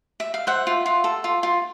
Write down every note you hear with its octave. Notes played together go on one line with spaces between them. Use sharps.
E5
F5
C5 E5 F#5
F4
F4
A4
F4
F4